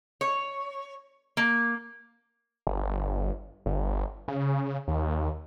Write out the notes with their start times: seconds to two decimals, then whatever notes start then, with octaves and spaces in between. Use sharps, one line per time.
0.21 C#5
1.37 A#3
2.67 G1
3.66 G1
4.28 C#3
4.88 D#2